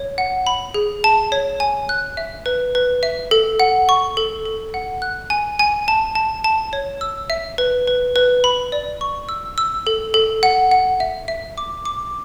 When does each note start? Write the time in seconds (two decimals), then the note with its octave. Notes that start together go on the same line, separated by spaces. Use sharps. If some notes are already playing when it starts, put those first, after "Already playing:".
Already playing: C#5
0.18 F#5
0.47 B5
0.74 G#4
1.04 A5
1.32 C#5
1.60 G#5
1.89 F#6
2.17 E5
2.46 B4
2.75 B4
3.03 E5
3.31 A4
3.60 F#5
3.89 C#6
4.17 A4
4.46 A4
4.74 F#5
5.02 F#6
5.30 G#5
5.59 G#5
5.88 A5
6.15 A5
6.44 A5
6.73 C#5
7.01 E6
7.30 E5
7.58 B4
7.87 B4
8.16 B4
8.44 B5
8.72 D5
9.01 C#6
9.29 E6
9.58 E6
9.87 A4
10.14 A4
10.43 F#5
10.71 F#5
11.00 E5
11.28 E5
11.58 D6
11.85 D6